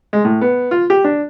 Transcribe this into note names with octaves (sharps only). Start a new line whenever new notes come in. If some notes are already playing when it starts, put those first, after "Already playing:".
G#3
A2
B3
F4
G4
D4